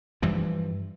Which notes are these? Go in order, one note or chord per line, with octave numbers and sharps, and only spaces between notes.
G2 E3 F3